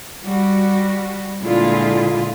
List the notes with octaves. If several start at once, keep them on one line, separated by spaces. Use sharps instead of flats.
G3 F#4
A#2 D3 G#3 E4 F4 G#4